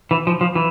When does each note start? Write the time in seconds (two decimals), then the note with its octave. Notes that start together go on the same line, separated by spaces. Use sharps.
0.11 E3
0.27 F3
0.41 F3
0.55 E3